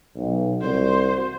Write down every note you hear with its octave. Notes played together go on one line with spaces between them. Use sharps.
B1
C2 F#4 C5